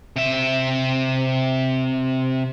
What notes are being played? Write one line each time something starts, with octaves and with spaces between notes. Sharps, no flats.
C3 E5